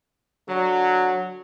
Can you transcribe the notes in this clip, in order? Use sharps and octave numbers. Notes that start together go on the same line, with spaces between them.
D3 F#3